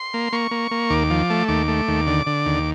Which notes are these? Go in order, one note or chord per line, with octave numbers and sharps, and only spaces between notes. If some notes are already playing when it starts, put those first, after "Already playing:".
Already playing: C6
A#3
A#3 C#6
A#3
A#3
D#2 D6
F3
A3
D#2 D6
A3
D#2
D3
D3
D#2